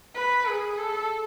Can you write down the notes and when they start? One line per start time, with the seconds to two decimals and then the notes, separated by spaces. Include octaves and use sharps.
0.15 B4
0.46 G#4
0.78 A4